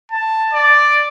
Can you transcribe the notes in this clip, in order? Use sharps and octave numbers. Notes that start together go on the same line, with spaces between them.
A5
D5